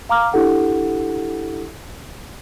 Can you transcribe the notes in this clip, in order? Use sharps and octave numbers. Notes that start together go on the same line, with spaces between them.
F5 A#5 D6 F6
D4 E4 G4 A4 F#5